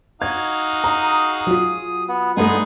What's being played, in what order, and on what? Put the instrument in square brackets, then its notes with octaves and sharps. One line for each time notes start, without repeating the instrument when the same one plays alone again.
[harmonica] D#4 F#4 F5 [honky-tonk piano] G#6
[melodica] G#4 D#6 [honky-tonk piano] A#5
[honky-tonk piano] F#3 F4
[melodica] B3
[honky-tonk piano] G2 A3 [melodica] G#3 B3 [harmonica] D#4 G#4